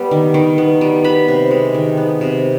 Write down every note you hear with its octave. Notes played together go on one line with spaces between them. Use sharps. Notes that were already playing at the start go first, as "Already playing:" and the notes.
Already playing: G3 B3
D#3
D#3
B3
G3
B3 B5
C3
G#3
D#3
B3
C3